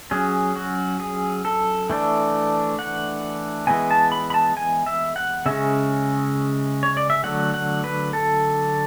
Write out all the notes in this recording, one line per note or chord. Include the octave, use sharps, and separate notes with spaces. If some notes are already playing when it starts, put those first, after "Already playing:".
F#3 C#4 G#4
F#4
G#4
A4
E3 A3 D4
F#5
E3 G#3 B3 G#5
A5
B5
B5
A5
G#5
E5
F#5
C#3 G#3 C#4 E5
C#5
D5
E5
D3 F#3 A3 F#5
F#5
B4
A4